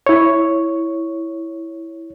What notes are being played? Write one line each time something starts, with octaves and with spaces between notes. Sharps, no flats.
E4 C#5